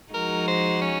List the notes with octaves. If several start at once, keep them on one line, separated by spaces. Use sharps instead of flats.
F3 G#3 D#4 F#4 A#4
C5
C#4